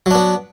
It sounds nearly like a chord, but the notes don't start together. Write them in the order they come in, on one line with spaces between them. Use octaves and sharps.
F#3 D4 B3